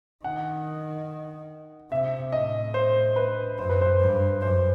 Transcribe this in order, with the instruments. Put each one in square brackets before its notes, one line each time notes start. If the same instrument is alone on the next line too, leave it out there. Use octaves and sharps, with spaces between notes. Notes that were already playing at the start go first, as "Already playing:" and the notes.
[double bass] D#3 [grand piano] F#5
[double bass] C3 [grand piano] E5
[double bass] A2 [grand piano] D#5
[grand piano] C5
B4
[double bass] F#2 [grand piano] C5
[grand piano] B4
C5
[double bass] G2
[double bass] F#2 [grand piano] C5